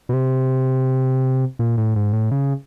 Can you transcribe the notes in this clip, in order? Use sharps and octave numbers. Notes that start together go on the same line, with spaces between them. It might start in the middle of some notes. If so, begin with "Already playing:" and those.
B2
C3
A#2
A2
G#2
A2
C#3